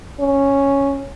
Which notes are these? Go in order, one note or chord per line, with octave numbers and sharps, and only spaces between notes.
C#4